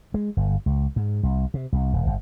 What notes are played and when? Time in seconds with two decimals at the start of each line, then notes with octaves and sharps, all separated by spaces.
0.14 G#3
0.37 G1
0.66 C#2
0.96 G#2
1.23 C2
1.54 C3
1.73 C2
1.93 D#1
2.06 G1